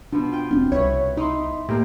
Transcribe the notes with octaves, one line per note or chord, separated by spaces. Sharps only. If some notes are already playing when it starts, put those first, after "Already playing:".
B2 F3 B3 D4
F4 G5
E1 C4 D4
C2 E4 B4 C#5
D#4 E4 C6
A2 A#3 G4